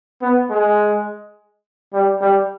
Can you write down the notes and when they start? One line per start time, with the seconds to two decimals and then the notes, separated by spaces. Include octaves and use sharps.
0.22 B3
0.50 G#3
1.93 G3
2.21 G3